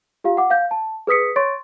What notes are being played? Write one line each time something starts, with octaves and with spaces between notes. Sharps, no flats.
F4 G4 F5
F#5 D6
F5 G6
A5
G#4 B4 D#6 B6 C#7
C#5 C6 C#6 A6 D7